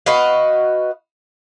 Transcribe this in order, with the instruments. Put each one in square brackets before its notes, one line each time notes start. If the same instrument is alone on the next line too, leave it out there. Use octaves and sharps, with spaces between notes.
[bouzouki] F#4 B4 D#5 F5